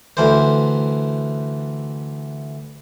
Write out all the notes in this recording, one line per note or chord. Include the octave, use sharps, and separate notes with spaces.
D2 E3 C5